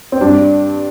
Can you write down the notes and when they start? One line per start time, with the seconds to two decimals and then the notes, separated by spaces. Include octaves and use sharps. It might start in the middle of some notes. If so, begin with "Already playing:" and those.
0.12 C4
0.21 G2 D4